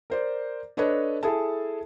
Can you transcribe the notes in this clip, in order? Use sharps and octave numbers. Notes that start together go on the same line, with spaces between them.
A#4 C5 D5
D4 A4 B4 C#5 D#5
E4 G#4 A4 A5